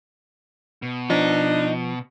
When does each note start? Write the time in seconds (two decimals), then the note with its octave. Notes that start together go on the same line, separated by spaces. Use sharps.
0.82 B2
1.10 F3 D4 D#4